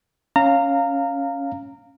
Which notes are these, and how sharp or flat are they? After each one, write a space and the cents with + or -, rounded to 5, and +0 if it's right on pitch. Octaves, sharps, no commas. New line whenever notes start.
C#4 +0 F5 +0 A#5 -25